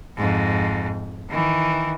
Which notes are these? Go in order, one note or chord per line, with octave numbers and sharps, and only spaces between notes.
F2 G#2
D#3 E3